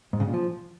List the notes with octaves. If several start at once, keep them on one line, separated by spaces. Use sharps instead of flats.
G#2
C#3
A#2
F3